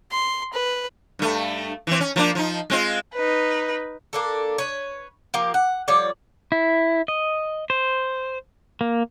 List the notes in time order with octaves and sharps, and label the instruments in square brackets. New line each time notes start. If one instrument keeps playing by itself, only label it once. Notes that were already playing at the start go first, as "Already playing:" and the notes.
[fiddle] C6
B4
[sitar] G2 A3
E3 C4
C#4
F3 A#3 D4
F3 D#4
G#3 C4 F4
[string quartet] D#4 B4
[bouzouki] A#3 D4 A4
B4 C#5
F3 A#3 G4
F#5
F3 G3 C#5 D5
[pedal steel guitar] E4
D#5
C5
A#3